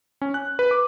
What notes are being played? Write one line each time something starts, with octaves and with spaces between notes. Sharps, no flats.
C#4
F#6
B4
D6